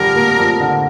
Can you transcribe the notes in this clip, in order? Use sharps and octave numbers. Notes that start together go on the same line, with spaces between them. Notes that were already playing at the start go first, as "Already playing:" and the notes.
Already playing: F2 D3 G3 A#4
A#3
F2
D3